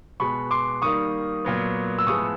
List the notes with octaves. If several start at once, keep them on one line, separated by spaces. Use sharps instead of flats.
B2 G#3 B3 B5 C#6
C6 D6
D#3 G3 A#3 C#6 D#6
A#2 F#3 B3
E6
A2 F3 G#3 B3 C#6 D#6